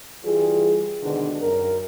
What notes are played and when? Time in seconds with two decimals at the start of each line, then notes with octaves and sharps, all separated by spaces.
0.24 E3 G3 F4 G#4
1.03 G#2 B2 D3 D#3 D4 G#4
1.42 F#2 A#4